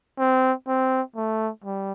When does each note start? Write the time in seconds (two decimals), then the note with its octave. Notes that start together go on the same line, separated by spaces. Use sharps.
0.19 C4
0.68 C4
1.16 A3
1.64 G3